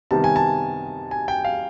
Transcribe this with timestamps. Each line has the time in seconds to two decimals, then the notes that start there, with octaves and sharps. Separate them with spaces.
0.11 C3 D#3 G3 B3 A5
0.24 G#5
0.36 A5
1.11 G#5
1.28 G5
1.44 F5